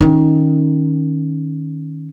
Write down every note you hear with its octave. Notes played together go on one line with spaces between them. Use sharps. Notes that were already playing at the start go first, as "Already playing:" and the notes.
D#3 C#4